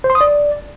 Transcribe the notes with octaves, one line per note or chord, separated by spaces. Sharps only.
C5
C6
D#6
D5